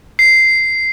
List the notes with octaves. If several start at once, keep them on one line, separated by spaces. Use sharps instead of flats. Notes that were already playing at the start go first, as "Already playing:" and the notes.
C7